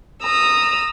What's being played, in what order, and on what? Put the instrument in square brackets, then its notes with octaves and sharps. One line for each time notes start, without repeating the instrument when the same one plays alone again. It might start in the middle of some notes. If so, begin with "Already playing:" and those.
[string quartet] A#5 D#6 E6